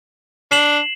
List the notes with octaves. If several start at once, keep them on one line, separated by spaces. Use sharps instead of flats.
D4 C7 E7 F#7